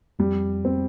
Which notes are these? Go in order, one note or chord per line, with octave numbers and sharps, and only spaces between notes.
F2 G3
C4